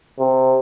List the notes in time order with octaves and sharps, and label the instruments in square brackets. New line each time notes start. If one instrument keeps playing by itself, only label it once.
[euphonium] C3